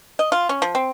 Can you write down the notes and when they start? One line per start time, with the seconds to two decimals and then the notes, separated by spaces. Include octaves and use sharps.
0.19 D#5
0.32 F4
0.49 C#4
0.62 F3
0.75 C4